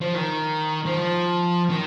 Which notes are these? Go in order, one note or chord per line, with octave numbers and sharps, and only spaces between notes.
F3
D#3
F3
D#3